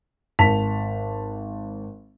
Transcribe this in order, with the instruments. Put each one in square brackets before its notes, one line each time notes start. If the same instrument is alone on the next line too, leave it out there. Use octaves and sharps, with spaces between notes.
[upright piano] G#1 A5 B6 F7